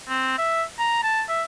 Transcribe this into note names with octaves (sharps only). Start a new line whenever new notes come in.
C4
E5
A#5
A5
E5